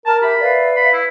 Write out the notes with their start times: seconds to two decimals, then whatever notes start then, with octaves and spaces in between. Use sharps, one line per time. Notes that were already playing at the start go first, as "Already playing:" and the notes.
0.06 A#4 A5 A#5 F6
0.22 G4 E5 B5
0.40 B4 D5 E5 F5
0.76 B5
0.93 E4